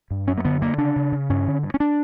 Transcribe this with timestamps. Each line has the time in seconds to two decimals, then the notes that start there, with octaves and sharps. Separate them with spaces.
0.11 G2
0.28 F#2 C#4
0.38 A#3
0.45 D3 B3
0.62 D3 A#3
0.78 C#3 D4
0.96 C#3
1.12 C#3
1.30 G2 C#4
1.47 D3
1.63 G2
1.74 C#4
1.80 D4